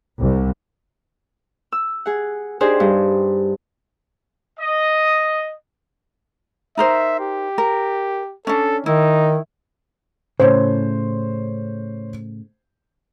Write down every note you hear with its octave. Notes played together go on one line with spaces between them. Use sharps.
C2
E6
G#4 F#5
D4 D#4 G4 G#4 C5 D5
G2
D#5
D#4 A#4 C5 E5
G4
A#4
C#4 D4 A4
D#3 D#4 E4
A2 C#3 C5 C#5